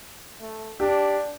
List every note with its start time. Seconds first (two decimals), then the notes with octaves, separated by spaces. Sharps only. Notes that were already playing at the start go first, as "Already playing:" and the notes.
0.41 A3
0.80 D4 G4